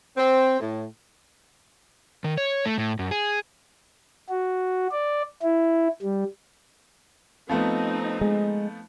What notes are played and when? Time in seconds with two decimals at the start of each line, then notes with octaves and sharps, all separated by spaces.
0.17 C4
0.60 A2
2.24 D#3
2.38 C#5
2.66 A3
2.78 A2
2.99 F#2
3.11 G#4
4.29 F#4
4.92 D5
5.42 E4
6.02 G3
7.49 F3 A3 B3 C4 D#4
8.21 G#3